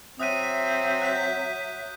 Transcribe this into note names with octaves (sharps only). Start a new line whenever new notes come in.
F#3 C4 E5 D#6 F#6 D#7
F#6 G6 B6